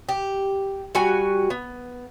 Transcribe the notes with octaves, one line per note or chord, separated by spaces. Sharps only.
G4
G3 F#4 G#5
B3